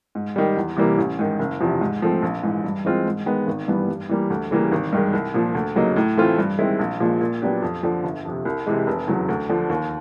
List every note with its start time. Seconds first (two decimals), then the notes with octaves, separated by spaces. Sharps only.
0.15 G#2
0.36 D#3 G3
0.56 E2
0.77 C3 E3 G3 A#3
0.98 A1
1.19 G#2 D#3
1.39 F#1
1.60 E2 C3 F3
1.81 G#2
2.02 F3 A3 C4
2.22 A#1
2.43 G#2 E3
2.64 G2
2.85 E3 G#3 C4 F4
3.06 G#2
3.26 D#3 G#3 B3
3.47 G#1
3.68 G2 E3 G3 B3
3.88 G2
4.09 E3 G3 A#3
4.30 D2
4.51 C#3 E3 G3 A#3
4.72 G#1
4.93 G2 D#3 G#3
5.13 C2
5.34 A#2 F3
5.55 D2
5.76 C#3 F#3 A#3 D#4
5.96 A2
6.17 E3 A3 C4 F4
6.38 G2
6.58 D#3 G#3 C4 E4
6.79 A#1
7.00 A#2 F3 G#3
7.21 A#2
7.42 F#3 B3 D4 G4
7.62 F2
7.83 D3 F3
8.04 G1
8.25 F2 C3
8.45 C2
8.67 C3 E3 G#3
8.87 F1
9.08 E2 C#3 F#3
9.28 D2
9.49 D3 F3
9.70 D#2